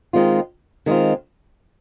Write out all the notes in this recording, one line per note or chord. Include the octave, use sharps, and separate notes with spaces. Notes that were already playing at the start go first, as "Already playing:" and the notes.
D#3 G#3 C4 F4
D#3 G#3 C4 F4